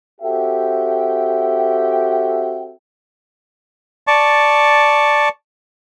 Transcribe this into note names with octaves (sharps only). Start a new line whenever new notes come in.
C4 F#4 G4 A4 E5 G5
D5 A5 C#6